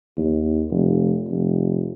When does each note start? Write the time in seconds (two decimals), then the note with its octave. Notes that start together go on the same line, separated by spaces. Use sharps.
0.17 D#2
0.70 F1
1.28 F1